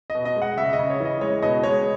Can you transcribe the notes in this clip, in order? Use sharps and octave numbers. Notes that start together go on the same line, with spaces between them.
D#5
B2
D#5
G#3
F#5
C#3 E5
D#5
C#3
C#5
E3 D#5
G#3 C#5
B2 D#5
G#3 C#5